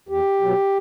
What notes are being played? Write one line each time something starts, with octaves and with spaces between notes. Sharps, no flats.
E2 G4
B2 F#3